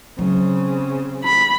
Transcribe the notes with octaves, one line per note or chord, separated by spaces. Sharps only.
C#3 F#3 C4
B5